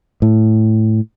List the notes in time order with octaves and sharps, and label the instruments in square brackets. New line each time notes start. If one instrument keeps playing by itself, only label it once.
[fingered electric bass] A2